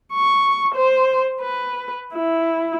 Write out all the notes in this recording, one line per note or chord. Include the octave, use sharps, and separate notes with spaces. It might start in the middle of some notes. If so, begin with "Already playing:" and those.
C#6
C5
B4
E4